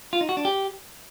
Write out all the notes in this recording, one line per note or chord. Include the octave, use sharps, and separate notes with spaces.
F4
D#4
F#4
D4
G4